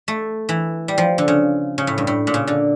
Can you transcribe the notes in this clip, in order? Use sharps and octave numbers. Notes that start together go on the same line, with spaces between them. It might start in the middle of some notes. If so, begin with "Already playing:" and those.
A3
E3
G3
F3
D3
C#3
C#3
A2
G2
A2
A#2
C#3
D3